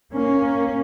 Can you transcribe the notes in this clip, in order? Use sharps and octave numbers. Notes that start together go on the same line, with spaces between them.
A#3 C#4